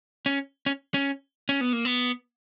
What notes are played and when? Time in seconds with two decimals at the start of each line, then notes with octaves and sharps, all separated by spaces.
0.26 C#4
0.66 C#4
0.94 C#4
1.49 C#4
1.61 B3
1.73 A#3
1.85 B3